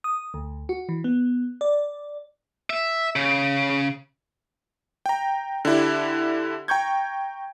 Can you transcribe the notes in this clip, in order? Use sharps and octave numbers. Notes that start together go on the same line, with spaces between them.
D#6
D2
F#4
E3
B3
D5
E5
C#3
G5 A#5
D3 D4 E4 G4
G5 A#5 C#6 G6 G#6